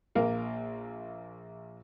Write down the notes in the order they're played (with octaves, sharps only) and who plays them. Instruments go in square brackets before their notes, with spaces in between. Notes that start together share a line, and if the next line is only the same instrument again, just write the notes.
[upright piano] A#1 A#3 A#4 F5